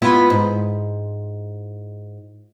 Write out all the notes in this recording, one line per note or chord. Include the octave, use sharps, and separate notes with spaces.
B3 E4 F4
G#2